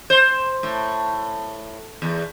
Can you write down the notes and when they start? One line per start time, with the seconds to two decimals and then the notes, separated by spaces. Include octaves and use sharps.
0.10 C5
0.63 A2
2.02 E2